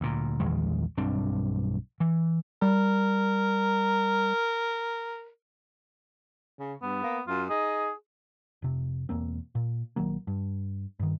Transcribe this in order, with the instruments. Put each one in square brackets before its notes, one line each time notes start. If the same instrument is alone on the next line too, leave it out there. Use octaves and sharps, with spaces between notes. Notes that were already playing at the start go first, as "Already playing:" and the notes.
[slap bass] D2 A#2
A#1 E2 D#3 G#3
B1 G2 C4 D4
E3
[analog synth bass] G3 [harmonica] A#4
[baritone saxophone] C#3
[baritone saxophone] G2 [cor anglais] B3
[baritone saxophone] A#3
[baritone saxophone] F#2 [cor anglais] F4
[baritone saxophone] D#4 [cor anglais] G#4
[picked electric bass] F1 C3
E1 E2 A#3 C4
A#2
A#1 D#3 F#3 A#3
G2
G2 D#3